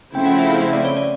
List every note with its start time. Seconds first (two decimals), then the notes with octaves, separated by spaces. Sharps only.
0.15 C#3 F3 A3 C4 E4 G5
0.26 F#5
0.39 E5
0.50 F5
0.61 E5
0.73 D5
0.85 C#5
0.97 D5